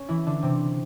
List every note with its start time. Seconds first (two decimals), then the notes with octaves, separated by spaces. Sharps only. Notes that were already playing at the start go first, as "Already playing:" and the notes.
Already playing: C#4
0.09 E3 E4
0.26 D3 D4
0.43 C3 C4